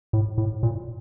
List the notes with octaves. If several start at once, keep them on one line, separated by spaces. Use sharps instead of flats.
A2
A2
A#2